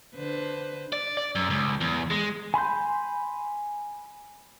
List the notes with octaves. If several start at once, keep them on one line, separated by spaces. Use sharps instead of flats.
D3 B4 C5
D5
D5
F#2
C#2
E2
G#3
G#5 B5 C6 G6